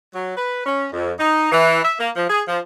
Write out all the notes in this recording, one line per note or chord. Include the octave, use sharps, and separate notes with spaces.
F#3
B4
C#4
F2
D#4
E3
E5
A#3
F3
G#4
F3